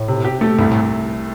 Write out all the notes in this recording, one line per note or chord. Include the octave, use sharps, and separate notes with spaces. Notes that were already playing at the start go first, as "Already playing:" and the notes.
Already playing: A2
C3
G4
A3
C2 G2
A2